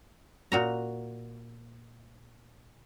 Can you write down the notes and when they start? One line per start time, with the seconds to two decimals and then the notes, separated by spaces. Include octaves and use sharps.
0.52 A#2 F#4 A#5